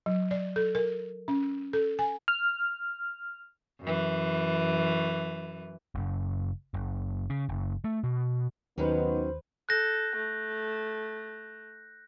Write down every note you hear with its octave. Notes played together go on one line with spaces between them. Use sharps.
F#3
D5
A4
A#4
C#4
A4
G#5
F6
F#2 E3
F#1
F#1
C#3
F#1
A3
B2
D#2 D#3 F#3 B3 C#4 D#4 B4 C5
A4 F#6 G6 A#6
A3